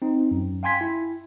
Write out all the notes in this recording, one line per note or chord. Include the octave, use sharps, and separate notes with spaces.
C4 D#4
F#2
F5 G5 G#5 C6 G#6 B6
E4